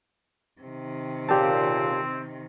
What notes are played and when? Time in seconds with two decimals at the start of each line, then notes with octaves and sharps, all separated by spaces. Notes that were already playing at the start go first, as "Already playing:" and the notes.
0.61 C3 D#3
1.29 A#2 C#3 C4 G4 A5